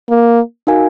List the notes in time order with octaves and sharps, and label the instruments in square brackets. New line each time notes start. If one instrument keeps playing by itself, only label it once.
[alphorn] A#3
[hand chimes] D#4 F#4 A#4 F5 G#5